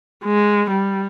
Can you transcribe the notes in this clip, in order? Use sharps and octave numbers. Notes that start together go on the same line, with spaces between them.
G#3
G3